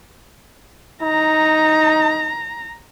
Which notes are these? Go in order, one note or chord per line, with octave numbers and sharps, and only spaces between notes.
D#4 A#5